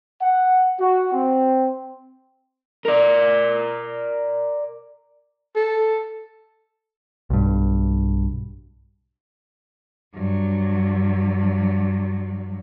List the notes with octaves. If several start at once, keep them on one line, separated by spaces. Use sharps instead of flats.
F#5
F#4
C4
A#4 D5
A4
B1 G2
G2 F#3